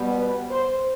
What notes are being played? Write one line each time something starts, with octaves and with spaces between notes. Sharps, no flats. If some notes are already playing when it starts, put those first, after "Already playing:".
Already playing: B2 G3 B3
B4
C5